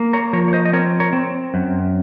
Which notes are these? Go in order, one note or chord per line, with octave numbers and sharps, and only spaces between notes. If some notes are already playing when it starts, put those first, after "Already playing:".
Already playing: A#3
A#4 C#5
F3 A#4 C#5
C#5
C5 D#5
D#5
C4 A#4 C#5
A#4 C#5
C4
F#2